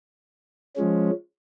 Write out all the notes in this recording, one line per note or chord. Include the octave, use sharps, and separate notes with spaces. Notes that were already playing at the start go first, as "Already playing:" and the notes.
F3 G#3 C#4